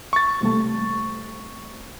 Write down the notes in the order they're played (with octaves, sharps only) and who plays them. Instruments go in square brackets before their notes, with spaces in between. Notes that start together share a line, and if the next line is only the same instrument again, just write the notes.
[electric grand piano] C#6 A6
[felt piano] C3 G3 A3